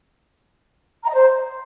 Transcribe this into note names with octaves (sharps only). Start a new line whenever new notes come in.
A#5
D#5
C5